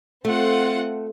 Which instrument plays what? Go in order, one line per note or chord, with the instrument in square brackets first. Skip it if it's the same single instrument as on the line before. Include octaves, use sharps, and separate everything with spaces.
[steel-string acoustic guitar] A3 [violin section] C4 F4 F#5